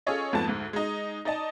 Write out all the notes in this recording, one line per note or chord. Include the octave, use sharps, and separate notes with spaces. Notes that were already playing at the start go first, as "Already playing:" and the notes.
C#4 F4 G#4 A4 C#5 D#5
F2 G#2 F3 A3 B3 A5
D2 G#2
G#3 D#4
D#4 D5 D#5 A5